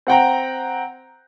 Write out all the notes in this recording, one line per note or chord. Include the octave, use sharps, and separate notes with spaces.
C4 F#5 G5 A#5